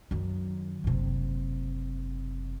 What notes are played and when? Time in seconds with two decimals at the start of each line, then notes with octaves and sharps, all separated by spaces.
0.11 F#2 D#3
0.84 F#1 C3